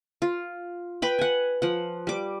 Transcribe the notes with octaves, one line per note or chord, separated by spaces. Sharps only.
F4
B4 G5 B5
F#5 G#5
F3 F#5
G3 D6